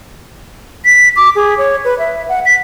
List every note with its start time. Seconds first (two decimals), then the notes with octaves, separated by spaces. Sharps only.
0.85 B6
1.17 D6
1.36 G#4
1.58 C#5
1.85 B4
1.99 E5
2.29 F#5
2.46 B6